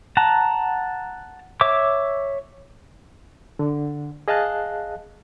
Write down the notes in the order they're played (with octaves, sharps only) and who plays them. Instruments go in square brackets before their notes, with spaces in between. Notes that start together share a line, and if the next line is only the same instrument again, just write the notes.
[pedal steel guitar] F#5 A5 A#5
C#5 E5 D6
[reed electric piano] D3
G#4 D#5 F5 A5 F#6